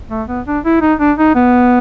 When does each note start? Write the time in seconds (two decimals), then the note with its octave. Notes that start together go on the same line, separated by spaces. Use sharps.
0.10 A3
0.28 B3
0.47 D4
0.64 E4
0.81 D#4
1.00 D4
1.18 D#4
1.35 B3